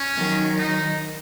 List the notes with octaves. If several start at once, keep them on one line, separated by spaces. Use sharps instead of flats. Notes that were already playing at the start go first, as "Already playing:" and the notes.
Already playing: C#4
D#3 F#3
D#4